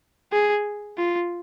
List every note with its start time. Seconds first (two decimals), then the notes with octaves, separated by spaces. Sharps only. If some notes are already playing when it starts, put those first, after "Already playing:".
0.32 G#4
0.98 F4